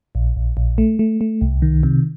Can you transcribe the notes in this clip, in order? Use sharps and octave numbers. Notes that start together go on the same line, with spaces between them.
A#1
A#1
A#1
A3
A3
A3
C2
D#3
C3